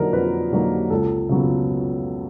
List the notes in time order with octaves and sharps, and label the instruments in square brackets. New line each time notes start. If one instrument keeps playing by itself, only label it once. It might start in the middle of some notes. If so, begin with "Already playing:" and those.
Already playing: [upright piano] F2 D3 F#3 A#3 D#4 A#4
F2 B4
D3 F#3 A#3 D#4
C#2 A4
C#3 F#3 B3